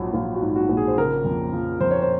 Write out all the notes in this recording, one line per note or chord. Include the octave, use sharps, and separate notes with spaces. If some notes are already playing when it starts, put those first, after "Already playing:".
Already playing: A#1 G#2 F#3
A#1 F4
F#4
G#2
F#4
A#1
G#4
C5
C#3 A#4
F2
F3
F2 C5
C#5
C5